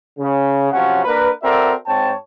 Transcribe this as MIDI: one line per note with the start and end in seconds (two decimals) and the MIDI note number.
0.18 0.71 49
0.72 1.02 48
0.72 1.02 53
0.72 1.02 54
0.72 1.02 61
0.72 1.02 78
1.04 1.30 58
1.04 1.30 62
1.04 1.30 70
1.04 1.30 71
1.43 1.74 60
1.43 1.74 66
1.43 1.74 69
1.43 1.74 70
1.43 1.74 74
1.43 1.74 76
1.86 2.13 44
1.86 2.13 60
1.86 2.13 73
1.86 2.13 79
1.86 2.13 81